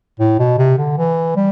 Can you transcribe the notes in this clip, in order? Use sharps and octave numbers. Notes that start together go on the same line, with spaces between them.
A2
B2
C3
D3
E3
G3